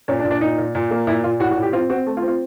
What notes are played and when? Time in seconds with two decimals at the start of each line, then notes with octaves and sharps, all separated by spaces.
0.08 A#2 C#4
0.19 D4
0.24 A#2
0.31 D4
0.41 A#2 D#4
0.58 A#2
0.75 A#2
0.91 A#3
1.07 A#2 E4
1.24 A#2 F4
1.40 A2 F#4
1.51 F#4
1.56 A2
1.62 G4
1.73 C4 F4
1.89 C4 F#4
2.07 A3
2.17 F4
2.22 C4
2.28 F4